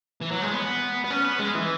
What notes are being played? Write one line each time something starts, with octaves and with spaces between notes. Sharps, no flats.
E3
F#3
G#3
B3
B3
C#4
B3
G#3
E3